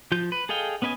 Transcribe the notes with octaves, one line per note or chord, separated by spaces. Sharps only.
F3 F4 G6
B4
G#4 A4 D#5 F5 G5
B3 C#4 B4 D#5 G#5